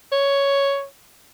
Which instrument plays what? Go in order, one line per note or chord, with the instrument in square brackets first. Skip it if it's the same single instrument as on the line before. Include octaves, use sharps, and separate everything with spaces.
[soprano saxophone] C#5